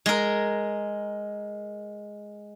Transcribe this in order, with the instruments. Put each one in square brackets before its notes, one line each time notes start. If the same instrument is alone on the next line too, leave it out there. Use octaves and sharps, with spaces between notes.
[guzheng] G#3 A#4